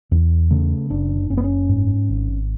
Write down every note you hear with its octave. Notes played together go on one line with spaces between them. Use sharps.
E2
C#3 A3
F#1 D4
F#1 C#4
B3
C#4
G#2
G#1